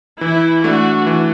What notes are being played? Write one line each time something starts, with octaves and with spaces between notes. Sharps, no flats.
E3 E4
A3 D4 F#4
E3